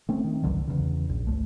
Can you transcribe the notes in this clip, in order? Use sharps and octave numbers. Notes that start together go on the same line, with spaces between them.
A3 C4 C#4
D#3
G1 C#2 D3 F#3
E2 C#3
A#1
G1 C#2 A3